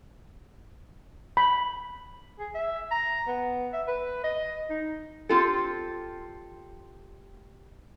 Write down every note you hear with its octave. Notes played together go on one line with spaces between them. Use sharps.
B5
G#4
E5
A#5
B3
E5
B4
D#5
D#4
C4 F4 G4 A4